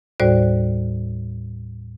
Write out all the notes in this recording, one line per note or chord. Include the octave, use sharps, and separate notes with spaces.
D#2 A2 G3 F#4 C5 D5